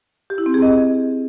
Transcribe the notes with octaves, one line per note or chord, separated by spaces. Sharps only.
G4
E4
C4
G#4
D#5